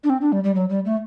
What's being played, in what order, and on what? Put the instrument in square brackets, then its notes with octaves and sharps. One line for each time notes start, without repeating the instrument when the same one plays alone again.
[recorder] D4
C4
D4
G3
G3
F#3
G3
A3